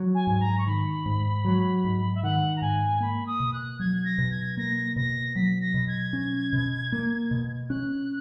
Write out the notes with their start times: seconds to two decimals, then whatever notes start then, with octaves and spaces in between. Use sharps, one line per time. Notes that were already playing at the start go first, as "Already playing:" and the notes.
Already playing: F#3
0.15 G#5
0.27 G#2 G#5
0.40 A#5
0.58 C#6
0.66 D#3 B5
1.06 G#2
1.45 F#3
1.84 G#2
2.15 E5
2.23 D#3 F#5
2.56 A#5
2.61 G#2 G#5
3.00 A#3 B5
3.26 D#6
3.40 B2
3.53 F#6
3.80 F#3 G#6
4.05 A#6
4.18 B2
4.31 G#6
4.57 A#3 A#6
4.96 B2 A#6
5.36 F#3 B6
5.61 A#6
5.74 B2
5.87 G#6
6.13 C#4
6.53 B2
6.92 A#3
7.31 B2
7.69 C#4 F#6